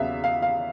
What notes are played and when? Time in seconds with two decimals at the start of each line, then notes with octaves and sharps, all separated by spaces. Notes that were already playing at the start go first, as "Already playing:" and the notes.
Already playing: E2 C#3 F#3 B3 E5 F5
0.24 F5
0.42 F5